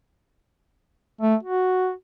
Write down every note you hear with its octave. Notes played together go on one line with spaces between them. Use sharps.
A3
F#4